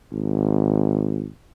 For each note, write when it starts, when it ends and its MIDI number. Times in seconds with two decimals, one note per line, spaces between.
0.12 1.28 32